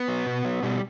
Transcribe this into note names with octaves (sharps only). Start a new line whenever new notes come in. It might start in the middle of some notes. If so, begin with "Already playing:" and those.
Already playing: B3
F#3
B2
F#3
B2 G3